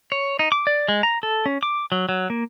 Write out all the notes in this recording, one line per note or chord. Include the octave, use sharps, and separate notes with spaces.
C#5
D#4
D6
D5
G#3
A#5
A4
C#4
D6
F#3
F#3
A#3